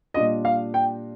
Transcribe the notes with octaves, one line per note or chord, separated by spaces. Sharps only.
A#2 G3 D4 F4 D#5
F5
G5